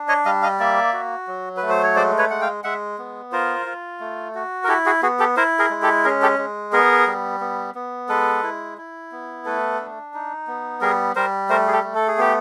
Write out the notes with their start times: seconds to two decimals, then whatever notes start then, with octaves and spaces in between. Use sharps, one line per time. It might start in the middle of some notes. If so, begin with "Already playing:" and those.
Already playing: D4
0.08 C#5 D#5
0.25 G3 D#5 F5
0.42 D#5 F5
0.59 A#3 D5 E5
0.93 F#4
1.28 F#3
1.57 B4
1.62 A3
1.69 C5
1.83 C#5
1.96 G#3 C5 D5
2.18 B4 C#5
2.30 G#3 F#5
2.41 F5 G5
2.64 G#3 E5 F#5
2.98 B3
3.32 F4 A#4 C5
3.66 F4
4.00 A3
4.35 F#4
4.64 A#4
4.68 E4 G4 A4
4.86 F#4 G#4
5.02 B3 F#4 G#4
5.19 G4 A4
5.36 E4 A#4 C5
5.59 G#4 A#4
5.70 G#3
5.82 G4 A4
6.04 C#4 G#4 A#4
6.22 G4 A4
6.38 G#3
6.72 B3 G#4 A#4
7.07 G3
7.41 B3
7.75 B3
8.09 G#3 A4 B4
8.43 E4
8.78 E4
9.12 B3
9.45 A3 A4 B4
9.80 D4
10.14 D#4
10.47 B3
10.81 G3 G#4 A#4
11.15 G3 A#4 C5
11.49 A3 A#4 C5
11.68 G#4
11.73 G4 A4
11.84 A3
11.95 A4
12.08 G#4
12.18 B3 G4